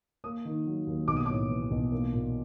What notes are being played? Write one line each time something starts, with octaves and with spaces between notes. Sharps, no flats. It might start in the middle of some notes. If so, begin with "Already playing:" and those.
A#3 D#6
D#3
F#3
D#2
B1 D6
D#6
A2 D6
E3
B1
A#3
A#2